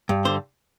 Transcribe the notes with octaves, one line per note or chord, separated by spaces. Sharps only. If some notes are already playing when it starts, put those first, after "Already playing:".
G2
D3 C5